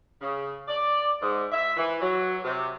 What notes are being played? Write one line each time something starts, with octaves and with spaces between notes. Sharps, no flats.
C#3
D5
G#2
E5
E3
F#3
C3